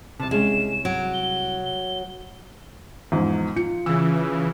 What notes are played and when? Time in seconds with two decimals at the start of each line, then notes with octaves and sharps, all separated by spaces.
0.20 C2 C3 A5
0.31 C2 G#3 C#4 E7
0.85 F#3 D7
1.14 G7
1.65 G7
3.12 E2 G#2 F3
3.56 F4 C#7
3.86 C#3 E3 E6